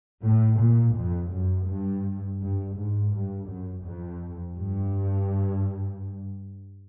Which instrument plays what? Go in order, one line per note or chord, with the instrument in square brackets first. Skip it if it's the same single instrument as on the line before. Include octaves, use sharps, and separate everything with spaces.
[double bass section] A2
A#2
F2
F#2
G2
G2
G#2
G2
F#2
F2
G2